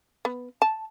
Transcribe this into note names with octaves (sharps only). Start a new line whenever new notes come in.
B3
A5